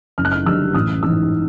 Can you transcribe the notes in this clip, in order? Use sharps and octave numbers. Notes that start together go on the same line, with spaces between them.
F#1 F6
F#6
F6
F#2 D3 G3 E6
A1 D#6
G#2 E3 E6